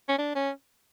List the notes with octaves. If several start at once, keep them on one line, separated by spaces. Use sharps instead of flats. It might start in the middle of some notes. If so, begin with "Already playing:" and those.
C#4
D4
C#4